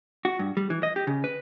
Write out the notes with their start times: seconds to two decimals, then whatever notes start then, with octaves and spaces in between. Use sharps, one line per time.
0.25 F#4
0.39 G2
0.57 G3
0.70 E3
0.83 D#5
0.96 G4
1.07 C#3
1.24 B4